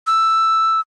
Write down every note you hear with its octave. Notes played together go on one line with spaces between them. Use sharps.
E6